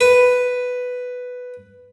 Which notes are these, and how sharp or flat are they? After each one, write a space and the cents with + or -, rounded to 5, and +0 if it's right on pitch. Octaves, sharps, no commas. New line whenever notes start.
B4 +5